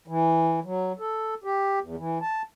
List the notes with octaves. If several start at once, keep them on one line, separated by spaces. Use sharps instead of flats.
E3
F#3
A4
G4
E2
E3
A5